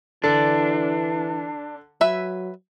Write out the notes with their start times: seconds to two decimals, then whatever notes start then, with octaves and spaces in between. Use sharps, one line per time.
0.24 D3 E3 D4
2.01 F#3 B4 E5 G#5